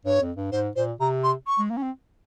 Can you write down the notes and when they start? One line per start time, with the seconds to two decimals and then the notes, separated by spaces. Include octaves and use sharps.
0.05 G2 C#5
0.21 F2
0.37 G2
0.52 G#2 C5
0.76 A#2 C5
1.00 C3 A#5
1.24 C6
1.47 C#6
1.59 G#3
1.70 A#3
1.77 C#4
1.83 C4